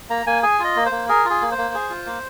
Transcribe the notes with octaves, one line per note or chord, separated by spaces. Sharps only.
A#3 A#5
A#3 G#5
G#4 G#5
F4 D#5
A#3
C5
A#3
G#4 A#4
F4
G#4
A#3
C5
A#3
G#4
F4
A#3